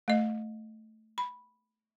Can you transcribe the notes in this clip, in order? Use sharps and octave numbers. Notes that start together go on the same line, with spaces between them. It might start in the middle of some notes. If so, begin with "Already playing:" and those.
A3 D#5
B5